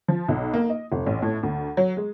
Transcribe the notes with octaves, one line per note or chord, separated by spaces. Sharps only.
F3
B1
A#3
D#5
F1
A1
A2
D2
F#3
G#3